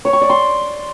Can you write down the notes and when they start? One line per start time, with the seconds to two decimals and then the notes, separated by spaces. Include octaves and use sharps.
0.05 C#5
0.13 C#6
0.21 D5
0.30 C6